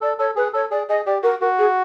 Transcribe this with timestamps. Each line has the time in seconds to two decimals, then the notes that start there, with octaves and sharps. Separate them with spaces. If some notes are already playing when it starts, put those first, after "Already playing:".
0.01 A4 D5
0.19 A4 C#5
0.36 G#4 B4
0.53 A4 C#5
0.71 G#4 D5
0.89 G#4 D#5
1.06 G4 D5
1.23 F#4 A#4
1.41 F#4 A#4
1.58 G#4